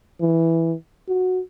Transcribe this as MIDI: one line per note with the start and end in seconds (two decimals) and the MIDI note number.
0.21 0.75 52
1.08 1.41 66